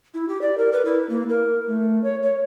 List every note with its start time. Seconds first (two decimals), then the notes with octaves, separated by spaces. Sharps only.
0.14 E4
0.28 G4
0.41 D5
0.58 A#4
0.72 B4
0.85 E4
1.09 A#3
1.29 A#4
1.67 A3
2.04 C#5
2.23 C#5